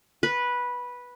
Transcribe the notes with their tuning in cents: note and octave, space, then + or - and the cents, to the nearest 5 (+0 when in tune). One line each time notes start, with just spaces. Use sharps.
B4 -10